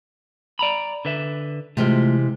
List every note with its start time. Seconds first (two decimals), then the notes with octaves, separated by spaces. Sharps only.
0.59 D5 A#5 B5
1.05 D3 B4 E5
1.77 C3 E3 G#3 A3 F4